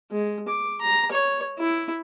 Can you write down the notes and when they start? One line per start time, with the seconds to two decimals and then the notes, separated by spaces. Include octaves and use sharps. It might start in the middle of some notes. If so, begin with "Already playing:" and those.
0.11 G#3
0.48 D6
0.81 A#5
1.12 C#5
1.59 E4